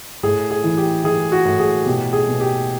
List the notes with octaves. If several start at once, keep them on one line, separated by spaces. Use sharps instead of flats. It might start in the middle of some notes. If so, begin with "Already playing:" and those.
A2 G#4
G#4
E3
G4
E3 G#4
F#4
A2
G#4
B2 G4
G#4
B2
G4